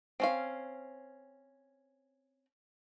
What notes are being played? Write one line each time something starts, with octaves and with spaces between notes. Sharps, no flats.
C4 C#4 F5